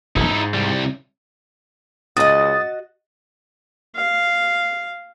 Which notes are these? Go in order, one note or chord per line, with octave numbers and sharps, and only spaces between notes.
E1 B1 D#4 E4
G#2
C2 G3
C#2 F#4 D#5 D#6 A6
F5